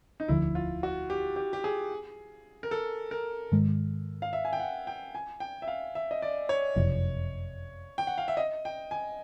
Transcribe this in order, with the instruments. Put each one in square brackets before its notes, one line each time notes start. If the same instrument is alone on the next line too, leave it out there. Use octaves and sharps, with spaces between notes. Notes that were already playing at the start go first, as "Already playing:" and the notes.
[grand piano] D#4
[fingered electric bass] E1 D2 D3 F3 [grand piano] E4
[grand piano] F4
F#4
G4
G4
G4
G#4
A#4
A4
A#4
[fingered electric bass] G#2 D#3 G#3
[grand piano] F5
E5
G#5
G5
F#5
G5
G#5
G5
E5
F5
E5
D#5
D5
C#5
[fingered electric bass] F#1 F2 C3
[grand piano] G5
F#5
F5
E5
D#5
G5
G#5